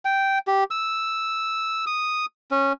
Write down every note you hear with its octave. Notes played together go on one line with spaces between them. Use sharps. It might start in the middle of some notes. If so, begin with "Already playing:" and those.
G5
G4
E6
D#6
C#4